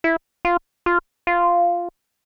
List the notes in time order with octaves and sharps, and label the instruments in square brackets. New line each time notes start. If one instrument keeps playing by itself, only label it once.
[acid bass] E4
F4
F4
F4